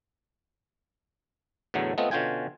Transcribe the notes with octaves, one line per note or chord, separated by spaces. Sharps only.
E2 A2 D3 F#3 A3
A3 B3 C4 F4 D#5
B2 D3 C#4 F4 G5 G#5